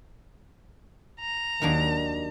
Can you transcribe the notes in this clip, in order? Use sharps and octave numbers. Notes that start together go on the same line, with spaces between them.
A#5
D#2 D#3 F#3 D4